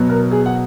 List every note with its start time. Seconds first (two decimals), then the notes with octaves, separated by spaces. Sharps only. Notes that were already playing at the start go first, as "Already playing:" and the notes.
Already playing: B2 F#3 B3
0.09 A#4
0.31 G#4
0.46 F#5